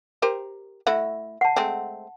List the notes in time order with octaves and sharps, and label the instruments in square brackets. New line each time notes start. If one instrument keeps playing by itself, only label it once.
[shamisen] G4 A#4 C5
[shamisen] A3 E4 F#4 [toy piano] E5
[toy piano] F#5 A5
[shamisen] G#3 A3 C4